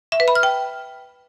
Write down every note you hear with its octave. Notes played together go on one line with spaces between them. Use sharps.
E5
B4
B5
F6
G5